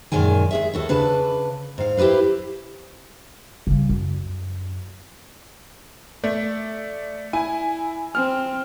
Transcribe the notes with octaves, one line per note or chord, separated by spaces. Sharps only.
F#2 A#2 D#3 G#3 G#5
G#3 G#4 E5
D#2 F#4 A4
C#3 D4 B4 A5
G#2 F5
E4 G4 G#4 B4 C5
C#3 G3
F#2
A3 D5
E4 G#5
C4 F6